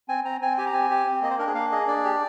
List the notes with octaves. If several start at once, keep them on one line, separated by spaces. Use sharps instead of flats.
C4 G#5
C4 A#5
C4 G#5
G4 G#5
A#5
C4 G#5
G4
C4
A#3 D#5
C5
D4 A#4
G#4
A#3 F5
G#4 D#5
D4 D5
G4